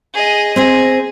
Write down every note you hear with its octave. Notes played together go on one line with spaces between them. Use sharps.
G#4 D#5
C4 G#4 C5 D#5